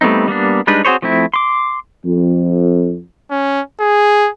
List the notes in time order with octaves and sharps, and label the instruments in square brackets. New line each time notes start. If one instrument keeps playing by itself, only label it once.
[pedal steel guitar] G3 A3 B3 C4 D#4
G3 A#3 B3 D4
G3 G#3 D4 D#4 B4
C4 F#4 G#4 C5 C#5
F3 A3 C4 E4
C6 D6
[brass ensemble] F2
[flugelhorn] C#4
G#4